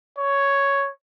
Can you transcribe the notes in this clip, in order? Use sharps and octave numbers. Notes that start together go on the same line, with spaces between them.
C#5